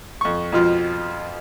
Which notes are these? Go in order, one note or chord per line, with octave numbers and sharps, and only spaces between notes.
F2 C#6
F2 B2 F3 F4